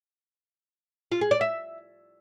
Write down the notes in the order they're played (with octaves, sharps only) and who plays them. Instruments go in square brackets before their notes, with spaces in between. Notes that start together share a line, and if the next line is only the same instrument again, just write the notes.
[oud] F4
G#4
D5
E5